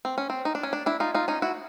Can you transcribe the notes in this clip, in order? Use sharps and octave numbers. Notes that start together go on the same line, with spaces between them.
C4
C#4
C4
D#4
D4
C#4
D4
D4 E4
D#4 F4
D#4 F4
C#4 D#4
E4 F#4